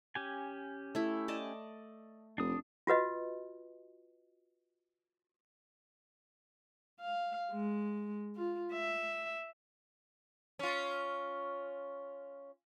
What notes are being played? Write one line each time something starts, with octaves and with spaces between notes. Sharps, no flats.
C#4 G4 G#5
A3 E4
D5 D#5 A5
F1 D4 D#6
F4 F#4 B4 D#5
F5
G#3
F4
E5
C#4 F4